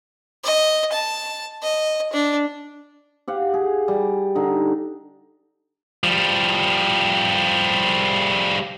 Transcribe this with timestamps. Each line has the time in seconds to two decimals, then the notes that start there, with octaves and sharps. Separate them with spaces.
0.44 D#5
0.92 A5
1.62 D#5
2.13 D4
3.28 G4 F5 F#5
3.54 G#4
3.88 G3
4.35 D3 D#4
6.04 F3 G3